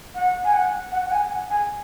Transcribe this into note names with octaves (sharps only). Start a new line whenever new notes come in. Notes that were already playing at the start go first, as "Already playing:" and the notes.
F#5
G#5
F#5
F#5
F#5
G#5
F#5
G#5